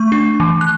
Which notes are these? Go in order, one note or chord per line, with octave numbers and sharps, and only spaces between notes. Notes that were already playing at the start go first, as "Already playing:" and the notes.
Already playing: A3 C#6
D4
E3
F#6